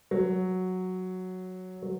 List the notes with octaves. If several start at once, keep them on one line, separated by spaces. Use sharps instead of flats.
F#3
F#3